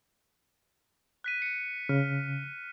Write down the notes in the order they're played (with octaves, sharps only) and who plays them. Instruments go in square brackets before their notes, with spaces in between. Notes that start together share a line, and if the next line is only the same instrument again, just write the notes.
[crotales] F#6 B6 D#7
C#7 D#7
[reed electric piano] C#3 [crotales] F6